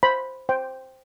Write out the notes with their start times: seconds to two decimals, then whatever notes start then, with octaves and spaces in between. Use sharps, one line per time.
0.03 C5 B5
0.49 C5 G5